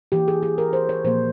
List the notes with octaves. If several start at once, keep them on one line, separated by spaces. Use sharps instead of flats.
E3 A#3 G4
G#4
G#4
A#4
C5
C#5
A#2 F3 A#3 C5